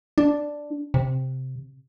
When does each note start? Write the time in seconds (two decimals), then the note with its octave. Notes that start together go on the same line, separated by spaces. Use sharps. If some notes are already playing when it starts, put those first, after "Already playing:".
0.18 D4
0.94 C3